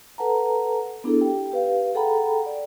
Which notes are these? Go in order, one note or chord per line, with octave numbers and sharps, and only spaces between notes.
A4 B4 F#5 A5 A#5
B3 D4 E4 G#4 A4
G4 G5
G4 B4 F5
G#4 A4 F#5 G5 A#5 B5
D5